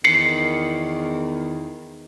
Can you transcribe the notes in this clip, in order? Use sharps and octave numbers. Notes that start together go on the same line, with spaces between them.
E2 D#3 C7 C#7